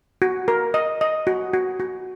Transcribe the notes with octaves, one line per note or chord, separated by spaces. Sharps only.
F#4
A#4
D#5
D#5
F#4
F#4
F#4